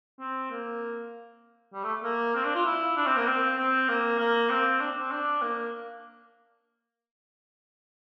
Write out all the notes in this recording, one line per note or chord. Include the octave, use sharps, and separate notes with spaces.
C4
A#3
G3
A3
A#3
C4
D4
F4
E4
D4
C4
A#3
C4
C4
A#3
A#3
C4
D4
C4
D4
A#3